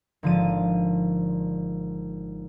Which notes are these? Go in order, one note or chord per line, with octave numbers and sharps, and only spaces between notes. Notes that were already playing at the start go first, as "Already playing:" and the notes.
G#1 D3 F3 A5 D#7